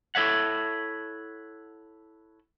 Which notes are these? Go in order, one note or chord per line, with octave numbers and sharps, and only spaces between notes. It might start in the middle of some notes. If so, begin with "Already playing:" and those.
E4 A4 C#5 E5 F#5